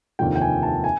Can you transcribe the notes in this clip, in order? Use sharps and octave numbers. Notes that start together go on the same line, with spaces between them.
F1 D#2 D3 F3 G5
G5
G#5
A5
G#5